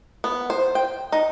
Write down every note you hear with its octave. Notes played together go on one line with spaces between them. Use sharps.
B3
C5
G5
D#4